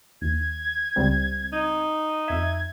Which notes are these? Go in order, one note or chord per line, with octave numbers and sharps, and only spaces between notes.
D#2 G#6
C#2 G3 C4
D#4
F2 E5 G#6